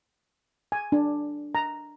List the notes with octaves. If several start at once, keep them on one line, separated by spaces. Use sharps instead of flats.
G#5
D4
A#5